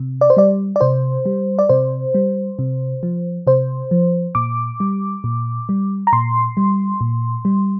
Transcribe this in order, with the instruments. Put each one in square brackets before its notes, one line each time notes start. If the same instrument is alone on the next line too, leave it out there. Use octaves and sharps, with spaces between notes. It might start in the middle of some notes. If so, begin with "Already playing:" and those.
Already playing: [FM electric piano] C3
D5
C5
G3 D5
D5
C3 C5
G3
D5
C3 C5
G3
C3
F3
C3 C5
F3
A#2 D6
G3
A#2
G3
A#5
A#2 C6
G3
A#2
G3